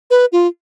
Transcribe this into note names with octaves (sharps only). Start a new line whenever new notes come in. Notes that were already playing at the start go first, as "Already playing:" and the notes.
B4
F4